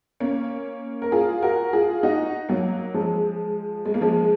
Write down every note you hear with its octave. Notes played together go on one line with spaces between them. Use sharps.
A#3 C#4
A#4
F4 G#4
F#4 A#4
F4 G#4
D#4 F#4
F#3 A#3
F3 G#3
G#3
A#3
F3 G#3